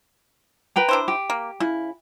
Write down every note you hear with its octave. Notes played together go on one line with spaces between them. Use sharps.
B4 G5 A#5
D4 E4 C5
G4
A#3
C#3 E4